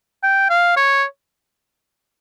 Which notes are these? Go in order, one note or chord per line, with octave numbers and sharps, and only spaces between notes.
G5
F5
C#5